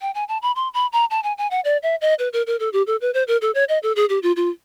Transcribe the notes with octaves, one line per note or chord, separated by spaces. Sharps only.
G5
G#5
A5
B5
C6
B5
A#5
A5
G#5
G#5
F#5
D5
E5
D#5
B4
A#4
A#4
A4
G4
A4
B4
C5
A#4
A4
C#5
D#5
A4
G#4
G4
F4
F4